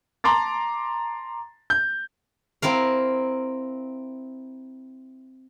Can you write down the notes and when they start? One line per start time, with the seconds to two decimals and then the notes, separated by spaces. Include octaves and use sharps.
0.24 A5 A#5 C6 D6 A6
1.70 G6
2.62 C4 E4 A#4 F5